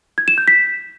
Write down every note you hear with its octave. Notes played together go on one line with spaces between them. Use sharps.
G#6
E7
G6
B6